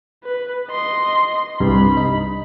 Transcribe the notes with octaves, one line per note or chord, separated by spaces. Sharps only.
B4
D#5 C6
C2 G2 B5
D#4